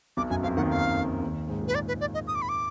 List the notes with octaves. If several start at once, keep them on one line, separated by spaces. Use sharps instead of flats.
B1 B2 D6
F#2 F#3 G#5
F2 F3 F5
D#2 D#3 F#5
F5
D#2 D#3
G#2 G#3
A#2 A#3
B4
D5
B4
D5
D#5
D#6
D6
B5
D6